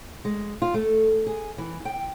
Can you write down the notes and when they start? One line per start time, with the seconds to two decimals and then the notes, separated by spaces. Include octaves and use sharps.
0.25 G#3
0.62 F4
0.74 A3
1.27 G#4
1.58 E3
1.85 G5